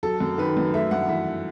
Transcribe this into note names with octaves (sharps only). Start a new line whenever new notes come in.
F#3 A4
F#2
D#3 B4
F#2
A3 E5
G2 F#5
E3 E5